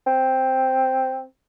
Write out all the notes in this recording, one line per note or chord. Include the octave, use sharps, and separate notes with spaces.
C4